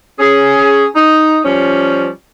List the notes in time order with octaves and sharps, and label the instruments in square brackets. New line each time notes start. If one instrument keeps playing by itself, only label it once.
[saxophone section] C#4 G#4
D#4
F3 G3 C#4